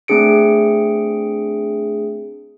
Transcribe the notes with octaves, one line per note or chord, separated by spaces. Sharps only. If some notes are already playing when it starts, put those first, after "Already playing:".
A3 C4 D4 G#4 C#7 D7